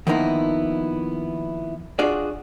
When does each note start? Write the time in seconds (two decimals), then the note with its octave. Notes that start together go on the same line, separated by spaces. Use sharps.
0.07 D#3 F3 A#3 B3 D#4 E4
1.99 D4 F4 F#4 G#4 D5